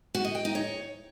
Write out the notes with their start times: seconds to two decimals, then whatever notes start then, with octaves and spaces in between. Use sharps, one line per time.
0.15 F#4
0.25 D#5
0.35 G5
0.45 D#4
0.55 C#5